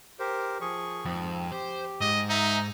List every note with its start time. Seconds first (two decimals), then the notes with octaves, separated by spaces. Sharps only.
0.19 G4 A#4 C5
0.61 F3 G#4 C#6
1.05 F2 G#2 C4
1.52 G4 C5
2.01 G#2 D#5
2.30 D#4 E5 A#5